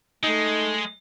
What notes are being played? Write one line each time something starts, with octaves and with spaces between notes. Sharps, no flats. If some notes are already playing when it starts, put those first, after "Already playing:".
G#3 A3 D#4